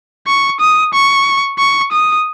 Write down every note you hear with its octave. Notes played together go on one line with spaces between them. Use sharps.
C#6
D#6
C#6
C#6
D#6